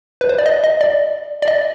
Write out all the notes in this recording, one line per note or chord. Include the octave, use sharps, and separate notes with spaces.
B4
C5
D5
D#5
D#5
D5
D5
D#5